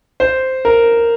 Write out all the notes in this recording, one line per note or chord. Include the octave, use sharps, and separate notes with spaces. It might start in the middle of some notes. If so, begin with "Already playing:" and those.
C5
A#4